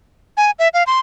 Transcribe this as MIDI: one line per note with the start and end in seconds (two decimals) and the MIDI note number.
0.37 0.51 80
0.59 0.68 76
0.74 0.83 77
0.87 1.00 84